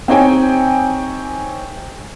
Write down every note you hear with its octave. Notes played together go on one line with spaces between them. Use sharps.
C4 D#4 G4 C#5 G5 G#5